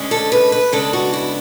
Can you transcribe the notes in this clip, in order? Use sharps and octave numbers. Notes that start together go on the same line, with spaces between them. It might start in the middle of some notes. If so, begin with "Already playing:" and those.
Already playing: D2 D3 G#3 C#4
A4
B4
B4
C#3 G#3 B3 D4 A4
F#4
E4